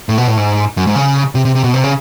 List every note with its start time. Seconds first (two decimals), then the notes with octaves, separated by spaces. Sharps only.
0.09 A2
0.18 B2
0.28 A2
0.37 G#2
0.77 F#2
0.87 G#2
0.96 C#3
1.35 C3
1.45 C3
1.55 C3
1.64 B2
1.74 C3
1.84 C#3